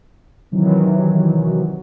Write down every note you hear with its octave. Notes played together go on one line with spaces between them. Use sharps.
C3 D#3 E3 F#3